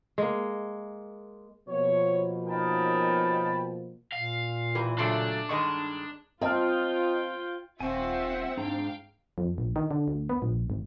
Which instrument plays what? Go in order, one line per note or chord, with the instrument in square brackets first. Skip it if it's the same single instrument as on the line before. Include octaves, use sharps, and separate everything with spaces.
[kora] G#3 A#3
[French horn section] B2 F3 A#3 [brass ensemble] C#5
[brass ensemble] C#4 D#4 A#4 [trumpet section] G5 A5 B5
[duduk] A#2 [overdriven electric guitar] F5
[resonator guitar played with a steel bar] E3 [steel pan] G4 A#4
[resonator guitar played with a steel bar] C#3 F#3 A3 [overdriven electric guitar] D4 [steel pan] A5 C6
[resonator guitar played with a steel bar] G2 D#3 G#3 [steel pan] D#5 C#6
[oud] C4 [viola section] F4 G5 [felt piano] D#5 A5 F6
[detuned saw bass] D#1 [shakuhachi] C4 [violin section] F4 E5 F#5 [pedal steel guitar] G#5 C#6
[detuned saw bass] G#2 [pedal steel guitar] D4 A#5 [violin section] F5 G5
[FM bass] F2
A#1
D#3
D3
D2
B3
A#1
G#1